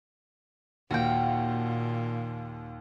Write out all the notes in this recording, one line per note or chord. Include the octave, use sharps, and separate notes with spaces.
D#2 A#2 F#4 F5 G5